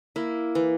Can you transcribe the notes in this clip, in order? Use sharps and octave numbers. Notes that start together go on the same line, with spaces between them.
A#3 E4
E3